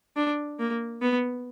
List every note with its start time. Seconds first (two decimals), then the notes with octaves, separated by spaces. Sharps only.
0.16 D4
0.59 A#3
1.02 B3